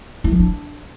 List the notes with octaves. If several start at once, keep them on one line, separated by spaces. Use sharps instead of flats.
E4
F3
D4